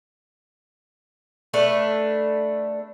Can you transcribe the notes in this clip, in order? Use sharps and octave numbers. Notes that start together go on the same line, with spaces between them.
A3 D4 B4